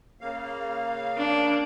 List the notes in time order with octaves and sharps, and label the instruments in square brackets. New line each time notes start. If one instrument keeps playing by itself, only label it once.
[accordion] C#3 A#3 F5
[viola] D4